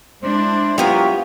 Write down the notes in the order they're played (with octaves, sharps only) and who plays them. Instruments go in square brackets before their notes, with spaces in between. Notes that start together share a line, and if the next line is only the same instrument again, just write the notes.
[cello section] G#3 D4 E4 [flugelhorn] C5
[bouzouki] F#3 B3 A#4 [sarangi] F4 [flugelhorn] G4